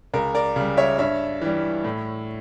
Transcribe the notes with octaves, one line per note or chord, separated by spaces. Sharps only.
C#2 A#4
A#4 D5
C#3 G3
C#5 E5
G2 C#5 E5
E3 G3
A2